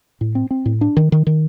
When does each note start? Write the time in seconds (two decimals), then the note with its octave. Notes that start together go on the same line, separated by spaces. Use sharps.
0.21 A2
0.35 C4
0.51 C4
0.66 A2
0.81 D4
0.97 D#3
1.12 D#3
1.27 D#3